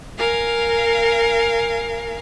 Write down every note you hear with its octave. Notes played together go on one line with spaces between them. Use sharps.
A#4 F5 G#5